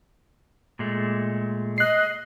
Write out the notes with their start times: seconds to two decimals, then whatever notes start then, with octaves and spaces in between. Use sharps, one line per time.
0.79 A#2 G#3 A3
1.78 D#5 F#6 C7